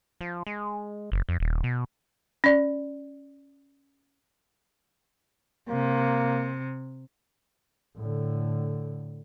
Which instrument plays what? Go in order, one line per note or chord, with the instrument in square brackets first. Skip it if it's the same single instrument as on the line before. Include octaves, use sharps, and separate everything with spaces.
[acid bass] F3
G#3
F#1
F2
D#1
B2
[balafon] C#4 D5
[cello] C3 [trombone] A#3
[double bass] A2 D3